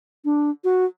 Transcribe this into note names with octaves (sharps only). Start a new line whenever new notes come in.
D4
F#4